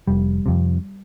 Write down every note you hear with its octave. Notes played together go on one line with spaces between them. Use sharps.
F1 G3
F2 C3